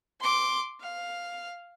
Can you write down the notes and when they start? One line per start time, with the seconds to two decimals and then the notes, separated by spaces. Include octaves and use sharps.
0.21 C6 D6
0.81 F5